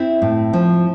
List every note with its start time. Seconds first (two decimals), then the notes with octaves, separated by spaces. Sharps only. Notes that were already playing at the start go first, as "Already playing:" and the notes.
Already playing: C4 E4
0.22 A2
0.53 F3